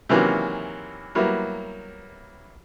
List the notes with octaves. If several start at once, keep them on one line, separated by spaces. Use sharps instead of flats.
C3 D#3 E3 F#3 A#3 C#4
F#3 G3 A#3 B3 E4